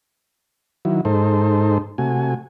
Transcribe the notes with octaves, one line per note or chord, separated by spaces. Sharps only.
D#3 F#3 E4
G#2 D#4 A4 C5
C3 A3 F#4 G#5